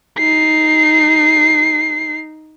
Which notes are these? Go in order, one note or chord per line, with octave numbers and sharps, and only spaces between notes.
D#4 C7